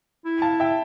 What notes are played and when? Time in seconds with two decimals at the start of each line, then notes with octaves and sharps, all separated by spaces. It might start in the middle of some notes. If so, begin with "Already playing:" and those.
0.25 E4
0.42 F5 A5
0.60 E5 G5